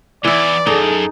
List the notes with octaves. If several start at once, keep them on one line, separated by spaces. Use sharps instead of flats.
E2 E3 E4 D5
F#2 D#4 G#4 A4